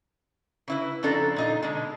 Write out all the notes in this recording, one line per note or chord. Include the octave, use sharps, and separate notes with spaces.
C#3 E4 B4
F2 C#3 D4 F4 A4 A#5
A#2 D#4 F4
B2 D3 G#3